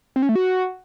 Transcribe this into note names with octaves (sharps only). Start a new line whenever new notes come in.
C4
C#4
A3
F#4